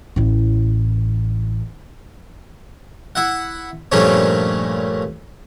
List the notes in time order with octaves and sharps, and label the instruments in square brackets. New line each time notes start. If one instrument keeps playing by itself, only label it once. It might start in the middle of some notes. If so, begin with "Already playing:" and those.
[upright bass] A1 E4
[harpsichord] E4 F#5
G2 A#2 F3 A3 C#4 D4